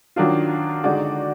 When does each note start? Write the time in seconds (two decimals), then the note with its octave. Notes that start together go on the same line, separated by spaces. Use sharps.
0.16 D#3 F#3 D4 F4
0.84 D3 G#3 D#4 F#4 D5